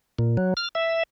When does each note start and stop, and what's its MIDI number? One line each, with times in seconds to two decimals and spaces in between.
0.19 0.37 46
0.37 0.54 54
0.57 0.68 89
0.75 1.03 76